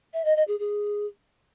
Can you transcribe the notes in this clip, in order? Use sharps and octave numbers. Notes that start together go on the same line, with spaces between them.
E5
D#5
D#5
G#4
G#4